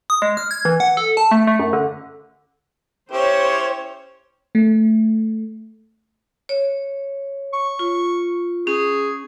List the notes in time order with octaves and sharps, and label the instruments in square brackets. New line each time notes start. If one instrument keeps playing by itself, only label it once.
[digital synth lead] D#6
G#3
F6
G#6
E3
F#5
A4
A5
A3
A3
F#2
D3
[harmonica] C#4 E4 G4 [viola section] C5 C#5
[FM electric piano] A3
[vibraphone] C#5
[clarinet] C#6
[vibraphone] F4
[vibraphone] C#4 [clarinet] G#4